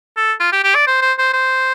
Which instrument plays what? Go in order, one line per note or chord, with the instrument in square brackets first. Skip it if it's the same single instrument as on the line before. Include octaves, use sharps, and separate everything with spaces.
[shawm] A4
F4
G4
G4
D5
C5
C5
C5
C5